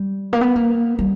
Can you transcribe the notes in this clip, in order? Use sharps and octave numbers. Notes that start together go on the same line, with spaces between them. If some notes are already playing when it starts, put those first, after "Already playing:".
Already playing: G3
A#3
B3
A#3
G3